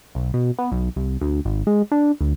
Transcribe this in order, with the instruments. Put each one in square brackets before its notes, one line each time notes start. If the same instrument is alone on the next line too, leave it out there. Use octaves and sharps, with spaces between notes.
[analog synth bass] B1
B2
B3
B1
C2
D2
G#1
G#3
D4
D2